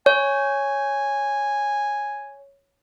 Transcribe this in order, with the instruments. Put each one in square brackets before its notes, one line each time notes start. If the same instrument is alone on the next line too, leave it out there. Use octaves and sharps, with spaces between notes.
[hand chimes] C#5 [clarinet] G#5